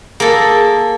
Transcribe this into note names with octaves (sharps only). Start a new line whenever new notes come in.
A#3 G#4 A4